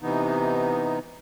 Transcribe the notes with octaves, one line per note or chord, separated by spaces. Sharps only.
C3 E3 B3 D#4